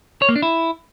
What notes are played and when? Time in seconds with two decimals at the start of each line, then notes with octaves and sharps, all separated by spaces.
0.22 C#5
0.29 A#3
0.36 D4
0.42 E4